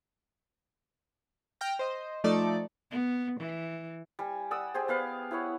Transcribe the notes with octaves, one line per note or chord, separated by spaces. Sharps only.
G5 F6 A#6
C5 D#5
F3 A3 D#4 A4 D5
B3
E3
G3 G#5
D5 F#5 D#6 E6
G4 G#4 C5
B3 B4 F5
E4 B4 C#5 F#5